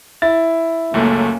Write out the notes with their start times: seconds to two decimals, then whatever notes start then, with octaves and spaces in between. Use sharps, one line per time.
0.22 E4 A6
0.94 C#2 F#2 A3 A#3 C#4